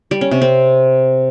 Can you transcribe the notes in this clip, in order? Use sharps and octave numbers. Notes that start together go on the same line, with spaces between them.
G3
C#4
C3
C4